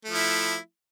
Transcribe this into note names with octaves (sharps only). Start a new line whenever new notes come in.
F3 A3 E4